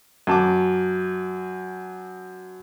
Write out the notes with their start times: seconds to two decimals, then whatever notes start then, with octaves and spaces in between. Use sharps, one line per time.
0.27 F#2 A5 D6